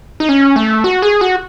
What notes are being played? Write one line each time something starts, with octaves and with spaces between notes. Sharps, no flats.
D#4
C#4
A3
F#4
G#4
F#4